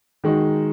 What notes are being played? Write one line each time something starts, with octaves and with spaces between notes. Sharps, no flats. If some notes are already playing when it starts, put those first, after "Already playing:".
D#3 G#3 D#4 F#4